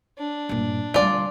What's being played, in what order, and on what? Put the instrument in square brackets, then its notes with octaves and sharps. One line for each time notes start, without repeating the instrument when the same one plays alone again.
[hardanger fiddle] D4
[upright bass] G2 A#2
[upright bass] D3 G3 [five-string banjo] F4 D5